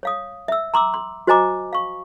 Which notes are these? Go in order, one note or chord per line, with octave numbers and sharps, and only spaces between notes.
C#5 F5 D#6
E5 E6
A#5 C6 D6 E6
C6
F#4 C5 D#5 G#5 A#5 D6
F5 C#6